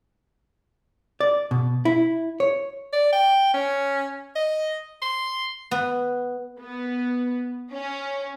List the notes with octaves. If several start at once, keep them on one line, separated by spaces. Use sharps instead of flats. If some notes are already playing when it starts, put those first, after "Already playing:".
D5
B2
E4
C#5
D5
G5
C#4
D#5
C6
B3
B3
C#4